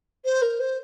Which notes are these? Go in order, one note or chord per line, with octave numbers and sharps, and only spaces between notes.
C5
A#4
C5